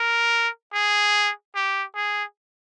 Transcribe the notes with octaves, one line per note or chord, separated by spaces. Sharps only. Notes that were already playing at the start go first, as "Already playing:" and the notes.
Already playing: A#4
G#4
G4
G#4